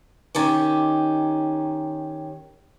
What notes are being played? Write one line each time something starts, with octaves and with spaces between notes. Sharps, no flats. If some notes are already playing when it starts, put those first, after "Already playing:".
D#3 C#4 G4